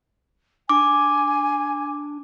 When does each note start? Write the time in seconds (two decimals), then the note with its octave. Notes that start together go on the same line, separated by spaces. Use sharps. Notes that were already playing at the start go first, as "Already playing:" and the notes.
0.69 D4 G#5 D6